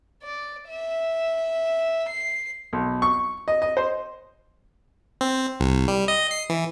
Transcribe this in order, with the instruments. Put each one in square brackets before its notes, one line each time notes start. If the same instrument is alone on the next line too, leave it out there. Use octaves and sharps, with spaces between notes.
[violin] D5
E5
C7
[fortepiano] B1
C#6
D#5
D#5
C5
[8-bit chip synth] C4
C2
G3
D#5
C7
E3